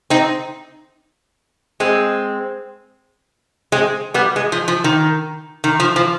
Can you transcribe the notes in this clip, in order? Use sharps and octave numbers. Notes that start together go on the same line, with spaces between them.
C4 D#4
G#3 C4
G#3 C4
G3 B3
G#3
F3
F3
D#3
D#3
F3
F3